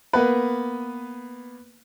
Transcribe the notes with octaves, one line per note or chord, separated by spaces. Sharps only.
A#3 B3 B4